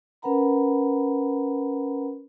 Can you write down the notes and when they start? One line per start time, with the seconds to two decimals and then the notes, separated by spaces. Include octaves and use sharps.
0.22 C#4 A#4 B4 F#5 A#5 B5